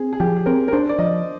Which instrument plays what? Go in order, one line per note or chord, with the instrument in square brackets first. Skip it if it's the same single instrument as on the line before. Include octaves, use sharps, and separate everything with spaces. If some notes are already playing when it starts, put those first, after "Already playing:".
Already playing: [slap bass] C4 [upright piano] G#4
[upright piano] G#4
[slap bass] F3 [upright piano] G4
[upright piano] G#4
[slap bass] C4 [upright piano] A#4
[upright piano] A#4
[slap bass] D4 [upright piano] C5
[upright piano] D5
[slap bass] F3 [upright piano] D#5